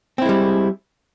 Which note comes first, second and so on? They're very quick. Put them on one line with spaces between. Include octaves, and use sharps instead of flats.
C4 E4 G#3 G3